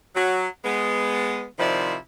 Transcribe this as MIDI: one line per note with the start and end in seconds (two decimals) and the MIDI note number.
0.15 0.47 54
0.65 1.45 56
0.65 1.45 59
1.59 1.95 48
1.59 1.95 51
1.59 1.95 53
1.59 1.95 64
1.59 1.95 74